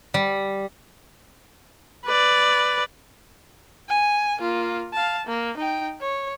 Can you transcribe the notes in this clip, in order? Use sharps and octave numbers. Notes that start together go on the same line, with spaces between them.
G3
B4 D5
G#5
A#3 F4
F5 A5
A#3
D#4 G5
C#5